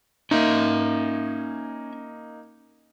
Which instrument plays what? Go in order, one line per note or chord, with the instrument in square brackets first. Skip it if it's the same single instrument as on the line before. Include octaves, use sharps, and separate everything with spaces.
[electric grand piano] A#3 D#4 [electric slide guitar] C#4 E5